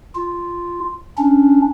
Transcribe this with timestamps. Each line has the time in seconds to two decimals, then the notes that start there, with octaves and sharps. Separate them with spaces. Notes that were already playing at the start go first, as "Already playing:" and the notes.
0.15 F4
1.18 C#4 D4